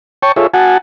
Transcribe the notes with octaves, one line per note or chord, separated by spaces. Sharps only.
C#5 G5 A5 C#6
F4 G#4 A4 C#5 E5
F#4 F#5 G#5 A5